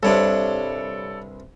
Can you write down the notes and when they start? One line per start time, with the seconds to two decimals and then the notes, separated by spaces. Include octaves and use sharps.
0.03 C2 G2 C3 A4 C#5 D5